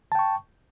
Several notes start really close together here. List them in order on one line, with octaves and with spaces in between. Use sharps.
A5 G5 C#6